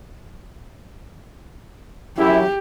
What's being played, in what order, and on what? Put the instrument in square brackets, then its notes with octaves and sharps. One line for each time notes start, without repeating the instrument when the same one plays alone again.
[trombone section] F#2 E4 [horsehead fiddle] G4